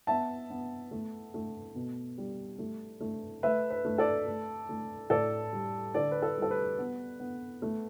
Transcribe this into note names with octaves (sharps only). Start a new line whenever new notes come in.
B3 E5 A5
B3
A3
A3
B2
G3
A3
A3
A3 B4 E5
B4
A3
A4 D5
A3
A3
A2 A4 D5
G3
D3 A4 D5
B4
A4
G3
A4
B4
B3
B3
A3